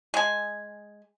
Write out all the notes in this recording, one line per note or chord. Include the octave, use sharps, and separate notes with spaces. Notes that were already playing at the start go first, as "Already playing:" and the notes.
G#3 G#5